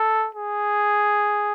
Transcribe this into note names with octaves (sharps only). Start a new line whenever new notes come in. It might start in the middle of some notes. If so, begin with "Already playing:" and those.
Already playing: A4
G#4